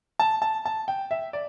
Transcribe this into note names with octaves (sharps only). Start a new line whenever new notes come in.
A5
A5
A5
G5
E5
D5